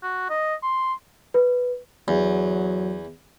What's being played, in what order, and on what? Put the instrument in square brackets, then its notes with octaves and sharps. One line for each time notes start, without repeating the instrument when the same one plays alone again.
[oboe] F#4
D#5
C6
[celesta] B4
[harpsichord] E2 [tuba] F#3